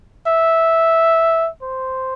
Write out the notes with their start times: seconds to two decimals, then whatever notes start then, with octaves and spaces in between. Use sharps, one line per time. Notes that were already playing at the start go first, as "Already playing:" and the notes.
0.27 E5
1.62 C5